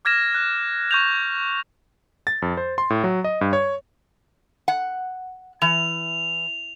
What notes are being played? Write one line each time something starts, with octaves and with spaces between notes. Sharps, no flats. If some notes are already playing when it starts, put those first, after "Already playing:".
D6 F6 G#6 A#6 E7
F#6
C#6 G6 F7
A6
F2
C5
C6
A2
F#3
D#5
G2
C#5
F#5
E3 F7